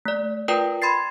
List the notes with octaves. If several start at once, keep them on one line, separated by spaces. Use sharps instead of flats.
A3 D5
F4 A#4 B4 D5 G5 D#6
B5 C6 G#6 A6 C7